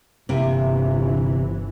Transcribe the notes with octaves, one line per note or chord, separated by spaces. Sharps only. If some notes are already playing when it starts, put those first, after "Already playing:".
G1 C3 E3 A#3 E4